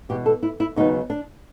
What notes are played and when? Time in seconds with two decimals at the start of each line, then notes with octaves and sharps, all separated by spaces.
0.09 E2 B2 G#3 G4
0.26 A4
0.43 E4
0.60 E4
0.76 D#2 C#3 F#3 B3 D#4
1.10 D4